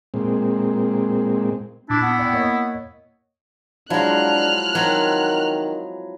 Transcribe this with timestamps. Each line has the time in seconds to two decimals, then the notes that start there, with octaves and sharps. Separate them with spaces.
0.14 A#2 G#3 C4
1.90 A#2 D4 E4 D6
2.03 B3
2.19 D5 F#5 G5
2.33 A#3 C#5 D#5
3.90 F3 F#3 G#3 D4 E4 F6 F#6
4.75 D#3 F#3 C4